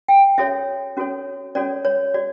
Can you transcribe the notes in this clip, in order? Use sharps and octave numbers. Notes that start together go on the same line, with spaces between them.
G5
C#4 F#4 A4 C#5 E5
C#4 F#4 A4 C#5
C#4 F#4 A4 C#5 D5
C#5
F#4 D5